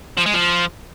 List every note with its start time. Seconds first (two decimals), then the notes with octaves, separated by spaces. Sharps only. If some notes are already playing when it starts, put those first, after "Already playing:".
0.18 F3
0.26 G#3
0.34 F3